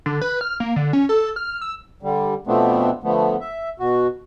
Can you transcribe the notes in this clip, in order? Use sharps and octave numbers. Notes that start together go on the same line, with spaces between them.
D3
B4
F6
A#3
D3
C#4
A4
F6
E6
D3 G3
B2 F3 A3 B3 C4 D4
D3 F3 A3 B3
E5
B2 F#4